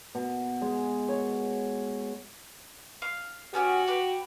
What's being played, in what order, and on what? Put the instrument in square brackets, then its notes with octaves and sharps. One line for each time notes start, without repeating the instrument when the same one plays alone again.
[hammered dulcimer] B2
G#3
C#5
[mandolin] F5
[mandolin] B3 C#4 G4 [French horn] F#4
[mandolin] G4 B4